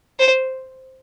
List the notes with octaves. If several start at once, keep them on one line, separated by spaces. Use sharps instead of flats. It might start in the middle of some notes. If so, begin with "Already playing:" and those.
C5